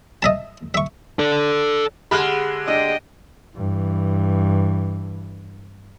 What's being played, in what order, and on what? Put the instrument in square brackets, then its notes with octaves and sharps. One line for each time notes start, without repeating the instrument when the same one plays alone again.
[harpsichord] D#5 E5 A5
E5 C#6
[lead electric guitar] A4 D5
[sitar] D3 G#3 [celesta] G4 G#4 F#5 [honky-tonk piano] B5 F6 F#6
[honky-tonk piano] D4 [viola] D#5 G5
[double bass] G2 E3